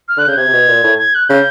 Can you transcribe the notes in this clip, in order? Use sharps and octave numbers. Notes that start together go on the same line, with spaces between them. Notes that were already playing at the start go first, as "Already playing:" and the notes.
F6
D3 F#6
C#3 G6
C3 G#6
C3
B2
A#2
A2
G#6
F#6
C#3 G6